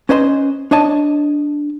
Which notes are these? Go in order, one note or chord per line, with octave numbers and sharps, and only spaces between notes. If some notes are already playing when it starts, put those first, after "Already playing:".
C#4 B4 C5 D#5 B5 C6
D4 C#5 D#5 A5